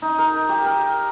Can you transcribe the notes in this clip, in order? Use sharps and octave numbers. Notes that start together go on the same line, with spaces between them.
D#4
A#4
G4
A#4